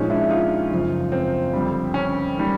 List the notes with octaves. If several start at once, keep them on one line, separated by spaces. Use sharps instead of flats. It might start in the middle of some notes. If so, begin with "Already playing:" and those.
Already playing: A#2 F3 G#3 C#4 D#4
D4 E4
D#4 F4
F#2 C#3 F3
C4
F2 D3 G3
C#4
D#3 G3